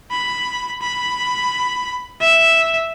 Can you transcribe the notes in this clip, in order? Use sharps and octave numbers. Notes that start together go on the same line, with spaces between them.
B5
B5
E5